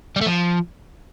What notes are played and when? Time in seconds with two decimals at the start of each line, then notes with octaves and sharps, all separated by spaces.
0.16 G3
0.21 A3
0.26 F3